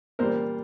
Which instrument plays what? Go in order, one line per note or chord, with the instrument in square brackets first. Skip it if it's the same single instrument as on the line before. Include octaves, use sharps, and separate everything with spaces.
[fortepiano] A#2 G3 A#4 C5